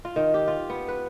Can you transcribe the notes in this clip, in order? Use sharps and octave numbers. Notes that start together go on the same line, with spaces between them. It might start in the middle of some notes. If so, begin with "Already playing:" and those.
F4
D#3
G4
F4
B3
B4